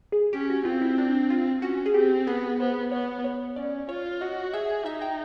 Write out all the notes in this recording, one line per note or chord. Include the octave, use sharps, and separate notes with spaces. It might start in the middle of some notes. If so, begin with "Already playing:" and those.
G#4
C#4 G4
F#4
C4 F4
E4
D4
F4
C#4 F#4
G#4
C4 G4
B3 G#4
B3 C5
B3 C#5
C#5
C#4 D5
F4 C#5
F#4 D#5
G#4 E5
D#4 E5
G5